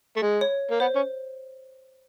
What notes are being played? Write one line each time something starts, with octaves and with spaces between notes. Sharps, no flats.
A3
G#3
C#5
A#3
B3 C5
C#4